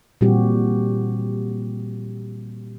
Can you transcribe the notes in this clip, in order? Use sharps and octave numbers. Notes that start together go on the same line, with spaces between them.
A#2 E3 G3 C4 F#4 G4